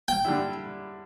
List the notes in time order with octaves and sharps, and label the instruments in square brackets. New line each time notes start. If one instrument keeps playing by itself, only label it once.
[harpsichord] G5
[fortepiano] D3 G3 E4